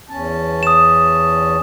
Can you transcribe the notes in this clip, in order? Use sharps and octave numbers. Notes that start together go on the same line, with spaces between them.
E2 C#4 A5
D#6 E7